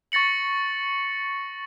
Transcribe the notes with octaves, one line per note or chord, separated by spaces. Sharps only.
C#6 A6 A#6 C#7 F#7